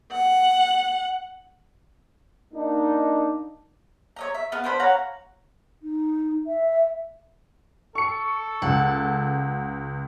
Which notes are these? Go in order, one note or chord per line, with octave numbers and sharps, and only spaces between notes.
F#5
A#3 D4 D#4
C#5 D#5 A#5
E5
B3 F5 D#6
B3 D4 C5 B5
C#5 F5 F#5 A#5
D#4
E5
A4 C#6 C#7
C#2 F#5